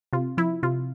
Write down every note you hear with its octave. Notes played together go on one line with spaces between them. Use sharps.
C3 F4
F3 E4
C3 F4